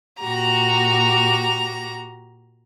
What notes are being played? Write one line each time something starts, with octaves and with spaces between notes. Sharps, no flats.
A#2 F#4 G4 A#5